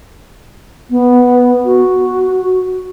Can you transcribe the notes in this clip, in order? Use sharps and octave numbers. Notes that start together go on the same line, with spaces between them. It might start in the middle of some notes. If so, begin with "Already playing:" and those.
B3
F#4